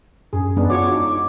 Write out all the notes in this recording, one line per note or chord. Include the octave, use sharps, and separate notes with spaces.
F#2 G#4
G#3 B3 D4
F4 F#4 C#5 D6
D#4